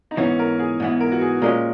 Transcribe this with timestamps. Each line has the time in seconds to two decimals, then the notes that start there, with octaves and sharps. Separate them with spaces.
0.11 D#4
0.17 G#2 E3 B3 C#4
0.39 A#4
0.59 G#4
0.80 G#2 E3 B3
1.00 A#4
1.12 F#4
1.21 G#4
1.41 A#2 G#3 C#4 A#4